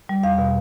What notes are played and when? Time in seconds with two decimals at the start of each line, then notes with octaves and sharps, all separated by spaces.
0.09 G3
0.23 E2 F5
0.38 B2